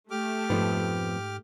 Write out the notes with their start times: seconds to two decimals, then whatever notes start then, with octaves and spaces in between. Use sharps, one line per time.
0.11 A3 G4 D6 F6
0.50 F2 G#2 F3 B3